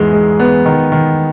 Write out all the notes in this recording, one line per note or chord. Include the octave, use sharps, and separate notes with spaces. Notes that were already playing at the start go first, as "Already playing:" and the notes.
Already playing: E2 G#2 G#3
G#3
B3
D#3
D#3